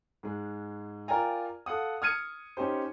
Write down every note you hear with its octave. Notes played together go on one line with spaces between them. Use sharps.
G#2 G#3
F4 A#4 D5 G5 G#5 A#5
A4 F5 F#5 D#6
D#6 F6 G#6 C#7 D#7
C#4 D#4 G4 C5